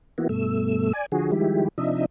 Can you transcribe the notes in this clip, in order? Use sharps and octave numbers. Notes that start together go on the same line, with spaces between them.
E3 A#3 B3 E4 F#4
G2 B2 A3 E6
D5 G#5
D3 F3 F#4 G#4
D#3 F3 G3 G#3 E4 G4
C3 F3 D4 D#4 D#5 E5